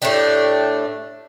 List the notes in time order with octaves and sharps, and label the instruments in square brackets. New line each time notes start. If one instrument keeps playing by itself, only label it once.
[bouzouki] A2 A3 D4 G4